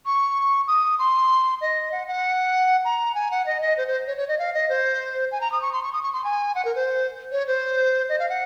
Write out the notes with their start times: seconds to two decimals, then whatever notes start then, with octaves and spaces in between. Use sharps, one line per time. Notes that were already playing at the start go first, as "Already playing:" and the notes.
0.06 C#6
0.68 D#6
0.99 C6
1.61 D#5
1.92 F#5
2.07 F#5
2.85 A#5
3.15 G#5
3.31 F#5
3.46 D#5
3.62 D#5
3.77 C5
3.88 C5
4.07 C#5
4.17 C#5
4.28 D#5
4.39 F5
4.54 D#5
4.69 C5
5.32 G#5
5.41 A#5
5.52 D#6
5.62 C#6
5.73 C6
5.83 C#6
5.93 D#6
6.03 C#6
6.13 C6
6.24 G#5
6.55 F#5
6.65 A#4
6.75 C5
7.32 C#5
7.47 C5
8.09 D#5
8.19 F5
8.29 F#5